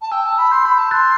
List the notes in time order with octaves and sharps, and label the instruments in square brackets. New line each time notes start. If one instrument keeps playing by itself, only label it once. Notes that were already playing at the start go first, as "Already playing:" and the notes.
[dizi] A5
[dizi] G5 [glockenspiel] E6
[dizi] A5
[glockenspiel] E6
[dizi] B5
[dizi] C6 [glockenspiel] G6
[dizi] B5 [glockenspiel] G6
[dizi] A5 [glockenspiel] G6
[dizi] C6 [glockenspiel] F#6 A6